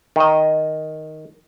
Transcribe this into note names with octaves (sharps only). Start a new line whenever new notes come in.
D#3 D#5